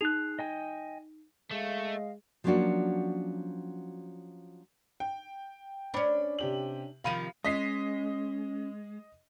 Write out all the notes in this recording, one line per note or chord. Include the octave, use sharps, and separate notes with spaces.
D#4 G#4 F#6 F7
D#5 G5 G#5
G#3 A3 D#5 F5
F3 F#3 A#3 C#4 D4 F#4
G5
C#4 D4 C5 B5 D6
C3 G4 F#7
C3 D#3 F3 F5 B5 D#7
G#3 C#4 D#5 B6 C7